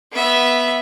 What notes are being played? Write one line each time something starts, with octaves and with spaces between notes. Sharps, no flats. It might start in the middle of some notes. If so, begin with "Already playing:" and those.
B3 E5